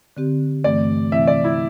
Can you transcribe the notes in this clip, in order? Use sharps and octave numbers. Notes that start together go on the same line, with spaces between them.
D3 C4 G4
G2 E3 A3 C4 D5
C3 E3 C4 E4 E5
D5
E4